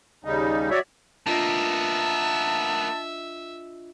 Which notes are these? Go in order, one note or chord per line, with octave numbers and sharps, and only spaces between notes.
D#2 C#3 G3 D#4
F#4 C#5 D5 E5
A#3 B3 D4 F4 D#5 E5 A5